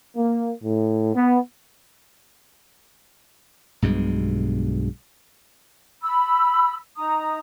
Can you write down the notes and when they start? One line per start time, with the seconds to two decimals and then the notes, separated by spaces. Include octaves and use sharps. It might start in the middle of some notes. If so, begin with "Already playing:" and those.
0.17 A#3
0.64 A2
1.16 B3
3.82 B1 G2 B2 G#3
6.01 B5 E6
6.96 D#4 A#5 D#6